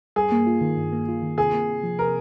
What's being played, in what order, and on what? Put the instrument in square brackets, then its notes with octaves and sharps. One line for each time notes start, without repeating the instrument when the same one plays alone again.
[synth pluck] G2 [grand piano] G#4
[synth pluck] A#3
F4
D#3
G2
A#3
F4
D#3
[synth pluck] C3 [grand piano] G#4
[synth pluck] A#3
C3
F3
[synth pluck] C3 [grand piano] A#4